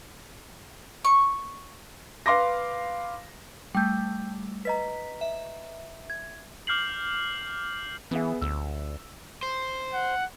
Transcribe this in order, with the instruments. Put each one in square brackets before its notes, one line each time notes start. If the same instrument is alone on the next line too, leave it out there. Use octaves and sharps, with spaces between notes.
[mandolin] C#6
[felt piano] B4 F5 C6 D6 A#6
[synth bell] G3 A3 [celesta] G5 G6
[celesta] B4 D#5 A#5 [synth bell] B6
[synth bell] E5
[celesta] G#6
[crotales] D6 F6 G6 C7 F#7
[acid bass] E3 [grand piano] B3 G#4 E5
[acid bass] D2 [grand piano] E6
[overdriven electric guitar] C5
[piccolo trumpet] F#5